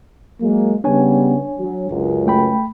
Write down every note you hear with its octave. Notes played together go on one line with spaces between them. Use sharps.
F#3 G#3 A#3
C#3 G3 B3 D4 C#5 G#5
F#3
C#2 F#2
A3 G5 B5